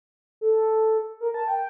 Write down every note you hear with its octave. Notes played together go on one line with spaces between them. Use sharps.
A4
A#4
A5
G5